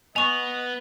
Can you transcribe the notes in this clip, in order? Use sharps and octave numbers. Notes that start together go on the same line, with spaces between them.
B3 D#5 G#5 C#6 F7